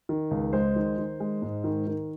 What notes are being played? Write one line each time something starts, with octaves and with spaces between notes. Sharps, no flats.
D#3
C#2
G#3 C5
D#3
D#3
G#3
G#2
D#3
D#3 A#4